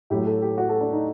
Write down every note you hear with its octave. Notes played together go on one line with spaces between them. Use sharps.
A2 F#3 G4
A4
G4
F#4
A4
D4
D#4